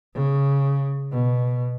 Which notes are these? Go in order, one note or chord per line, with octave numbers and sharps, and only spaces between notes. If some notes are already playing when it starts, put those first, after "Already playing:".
C#3
B2